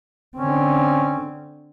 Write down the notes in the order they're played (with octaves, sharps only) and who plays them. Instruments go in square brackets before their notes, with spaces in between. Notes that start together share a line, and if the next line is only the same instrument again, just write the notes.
[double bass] D3 C4 [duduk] C#4